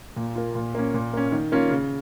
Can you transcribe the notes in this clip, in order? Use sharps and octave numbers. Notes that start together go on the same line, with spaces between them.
A#2
A#3 F4
A#2
A#3 C#4
A#2
A#3 C#4
D#3
A#3 C#4 F4
C#3